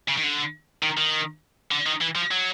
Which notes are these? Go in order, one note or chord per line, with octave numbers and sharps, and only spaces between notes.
C#3
D#3
D3
D#3
D#3
D3
D#3
E3
F3
F#3